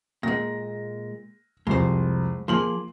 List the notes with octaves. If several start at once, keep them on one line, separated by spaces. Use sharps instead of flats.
A#2 G#3 A#6
C2 F2 G#3 C5
F3 A#3 G#4 C6 F#7